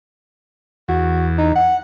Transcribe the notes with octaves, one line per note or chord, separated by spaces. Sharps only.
E2 F#4
D#4
F#5